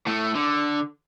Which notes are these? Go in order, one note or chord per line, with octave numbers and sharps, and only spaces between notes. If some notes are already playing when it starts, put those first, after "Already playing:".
A2 A3
D3